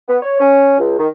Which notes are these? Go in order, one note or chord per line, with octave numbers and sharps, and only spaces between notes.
B3
C#5
C#4
C#2
D#3